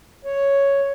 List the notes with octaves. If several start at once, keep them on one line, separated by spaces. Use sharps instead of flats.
C#5